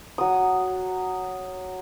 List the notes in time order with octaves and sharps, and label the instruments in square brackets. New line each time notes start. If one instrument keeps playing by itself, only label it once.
[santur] F#3 D#6